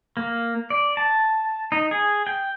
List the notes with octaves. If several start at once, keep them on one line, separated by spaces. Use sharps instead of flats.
A#3
D5
A5
D#4
G#4
G5